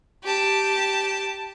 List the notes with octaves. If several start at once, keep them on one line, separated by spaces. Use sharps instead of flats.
G4 A5